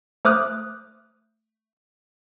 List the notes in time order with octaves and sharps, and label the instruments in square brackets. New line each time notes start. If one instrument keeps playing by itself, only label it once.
[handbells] A3 C5 D6 D#6 F6 F#6